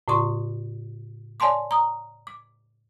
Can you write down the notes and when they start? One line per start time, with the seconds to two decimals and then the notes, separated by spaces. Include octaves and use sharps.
0.08 A2 C#3 F4 D5 C6 C#6
1.40 C#5 D5 G#5 A5 C6 D6
1.71 A#5 D#6
2.27 D6